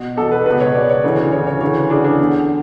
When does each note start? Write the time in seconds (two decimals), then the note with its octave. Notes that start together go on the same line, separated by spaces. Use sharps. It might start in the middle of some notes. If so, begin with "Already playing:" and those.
Already playing: B2
0.17 E2 B2 A4
0.32 B4
0.46 C#2 B2 B4
0.61 C#5
0.75 C#2 B2 D5
0.89 C#5
1.04 D2 C#3 E3
1.32 D2 C#3 E3 C#5
1.47 C#5
1.61 D2 C#3 E3 C#5
1.90 D2 C#3 E3 D4
2.04 D4
2.19 E2 D3